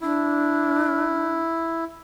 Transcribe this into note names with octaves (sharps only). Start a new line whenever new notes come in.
D4 E4